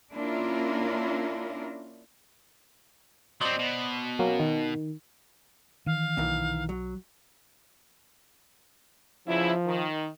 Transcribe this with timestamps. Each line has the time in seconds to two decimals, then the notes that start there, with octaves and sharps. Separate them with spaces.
0.12 A#3 C#4 D4 E4 F4 A#4
3.41 F#3 C4 C5 D5 D#5
3.59 B2
4.19 F#3 A#3 C#4
4.40 D#3
5.86 D#3 E3 F5
6.17 B1 A#2 D#3 E3
6.69 F#3
9.28 E2 C#3 F3 E4
9.67 D#3